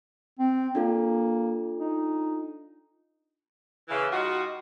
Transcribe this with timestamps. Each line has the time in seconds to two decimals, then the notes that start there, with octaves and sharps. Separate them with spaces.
0.39 C4
0.75 A#3 D4 F4 A4
1.78 D#4
3.88 C#3 E3
4.11 G3 D#4 F4 F#4